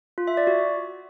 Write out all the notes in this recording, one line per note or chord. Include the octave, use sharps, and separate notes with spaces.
F4
E5
D5
F#4